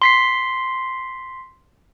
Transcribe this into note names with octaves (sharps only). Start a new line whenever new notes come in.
C6 B6 C7